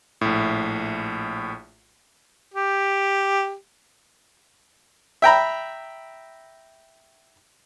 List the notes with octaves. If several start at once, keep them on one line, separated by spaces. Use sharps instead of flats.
A#1 A2
G4
E5 G5 A#5 B5